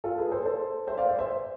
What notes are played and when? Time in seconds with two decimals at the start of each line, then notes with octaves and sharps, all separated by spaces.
0.04 F4 A4
0.18 G#4 B4
0.32 A4 C5
0.46 A4 C5
0.87 C5 E5
0.98 D5 F5
1.09 C5 E5
1.19 C5 E5